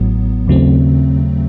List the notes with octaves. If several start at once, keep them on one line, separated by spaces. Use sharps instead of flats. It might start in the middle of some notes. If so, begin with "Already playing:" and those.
Already playing: A1 A2 F#3 B3
D#2 C#3 F#3 A3 C4